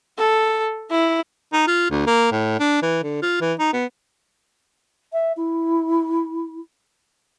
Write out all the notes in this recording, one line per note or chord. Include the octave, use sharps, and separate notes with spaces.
A4
E4
D#4
F4
D2
A#3
A2
D4
E3
D3
F4
E3
D#4
B3
E5
E4